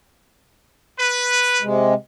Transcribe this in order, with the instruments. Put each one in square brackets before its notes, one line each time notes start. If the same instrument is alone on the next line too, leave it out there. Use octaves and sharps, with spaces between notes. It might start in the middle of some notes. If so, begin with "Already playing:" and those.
[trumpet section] B4
[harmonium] C3 G#3